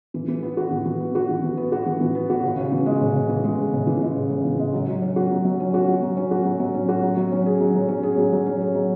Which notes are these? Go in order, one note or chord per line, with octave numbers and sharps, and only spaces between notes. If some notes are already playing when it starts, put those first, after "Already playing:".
E3
E3
B3
F#4
E3
E3
B3
F#4
E3
E3
B3
F#4
E3
E3
B3
F#4
C#3
C#3
E3
G#3
C#3
C#3
E3
G#3
C#3
C#3
E3
G#3
C#3
C#3
E3
G#3
F#3
F#3
C#4
F#4
F#3
F#3
C#4
F#4
F#3
F#3
C#4
F#4
F#3
F#3
C#4
F#4
F#3
F#3
C#4
G#4
F#3
F#3
C#4
G#4
F#3
F#3
C#4
G#4
F#3